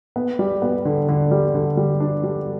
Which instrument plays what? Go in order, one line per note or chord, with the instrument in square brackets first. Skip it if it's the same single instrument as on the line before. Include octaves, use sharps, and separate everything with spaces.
[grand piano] B3
G3
B3
D3
D3
G3
D3
G3
D4
G3